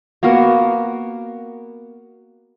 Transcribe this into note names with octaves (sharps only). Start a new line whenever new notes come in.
A#3 B3 F#4 A#4